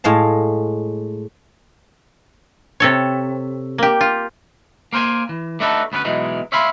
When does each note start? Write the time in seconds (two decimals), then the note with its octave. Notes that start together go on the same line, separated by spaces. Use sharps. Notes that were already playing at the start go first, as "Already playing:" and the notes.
0.04 A2 G#3 F5 A5
2.80 C3 A4 C#5
3.78 A#3 G4
4.01 F4
4.93 A#3 A#4 C5 G5 G#5
5.29 E3
5.60 A3 D4 D#4 F#4 A4 B4
5.92 D2 B3 C#4 E4 B4
6.05 B2 E3 F#3 G#3 D#4
6.52 C#5 E5 F5 G#5 B5 C6